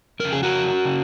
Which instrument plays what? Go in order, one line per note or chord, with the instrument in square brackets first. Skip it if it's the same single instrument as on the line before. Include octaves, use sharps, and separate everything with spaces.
[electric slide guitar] F2 C#3 A#4
G#4
F#4 A#4
C#3